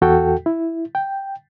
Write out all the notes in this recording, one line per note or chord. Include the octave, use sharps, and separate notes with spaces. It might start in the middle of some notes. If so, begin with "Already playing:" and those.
E2 F#4 A4 G5
E4
G5